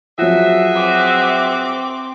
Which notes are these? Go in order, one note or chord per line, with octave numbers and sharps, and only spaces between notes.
F3 F#3 F#4 G#4 E5
C4 D6